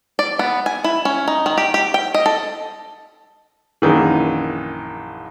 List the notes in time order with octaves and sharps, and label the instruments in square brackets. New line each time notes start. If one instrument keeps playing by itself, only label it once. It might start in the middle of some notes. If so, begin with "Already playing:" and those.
[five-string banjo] D5
B3
G#5
E4
C#4
D#4
D#3
G4
G4
G5
D#5
A4
[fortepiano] A#1 F#2 D#3 E3